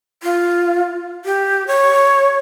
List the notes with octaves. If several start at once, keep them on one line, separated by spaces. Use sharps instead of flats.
F4
G4
C#5